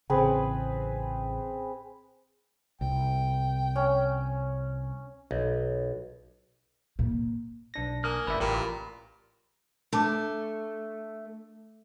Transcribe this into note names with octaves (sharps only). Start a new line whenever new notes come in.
A1 C#3 C4 G#4 B4
C2 G5
C#4
B1
A#2
B1 D4 A#6
A#3 G#5 D#6 F6
G1 B4 D5 E5
A1 A#2 G4 A#4 B5
A3 D4 A5 D6